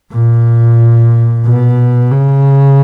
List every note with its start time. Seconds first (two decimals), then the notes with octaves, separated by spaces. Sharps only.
0.13 A#2
1.46 B2
2.12 C#3